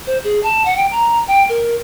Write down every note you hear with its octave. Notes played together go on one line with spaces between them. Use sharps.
C5
G#4
A5
F#5
G5
A#5
G5
A#4